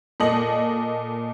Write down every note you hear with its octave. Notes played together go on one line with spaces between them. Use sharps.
A#2 A4 D#5 F#7